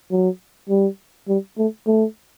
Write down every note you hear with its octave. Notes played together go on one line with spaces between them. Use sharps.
F#3
G3
G3
A3
A3